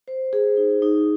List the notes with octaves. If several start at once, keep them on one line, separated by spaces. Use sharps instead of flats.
C5
G#4
D#4
D#4